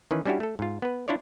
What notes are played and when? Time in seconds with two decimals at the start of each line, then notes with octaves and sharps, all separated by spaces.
0.11 D#3 E3 C#4 B4
0.25 G3 C#4 D4 E4 F#4 G4
0.40 A3 A4
0.59 G#2 F4
0.82 B3 B4
1.08 D4 E4 F4 C#5 D5